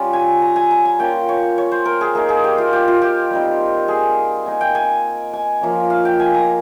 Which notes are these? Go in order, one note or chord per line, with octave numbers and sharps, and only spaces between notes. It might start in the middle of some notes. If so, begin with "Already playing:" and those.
Already playing: G3 C#4 F4
G#5
A#5
G#5
A#5
G#5
A#3 C#4 F4 G5
C#5
C#5
C5
A#4
G#4
A#3 D#4 G#4
G#4
G4
F4
G4
F4
G4
G3 C4 D#4
G#4
A#3 D#4 G#5
G5
G#5
G#5
F3 A#3 C#4
F5
G5
G#5
A#5